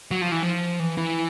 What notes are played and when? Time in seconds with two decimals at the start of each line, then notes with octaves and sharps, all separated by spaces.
0.11 F#3
0.22 F3
0.32 E3
0.43 F3
0.80 E3
0.97 E3